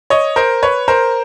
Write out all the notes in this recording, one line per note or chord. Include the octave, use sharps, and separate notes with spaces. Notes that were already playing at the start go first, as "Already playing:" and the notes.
C#5 D#5
A#4 C5
B4 C#5
A#4 C5